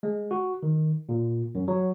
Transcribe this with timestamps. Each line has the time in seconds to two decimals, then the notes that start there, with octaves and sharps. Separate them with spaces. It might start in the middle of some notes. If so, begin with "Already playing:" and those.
0.03 G#3
0.31 F#4
0.63 D#3
1.09 A#2
1.55 F#2
1.68 F#3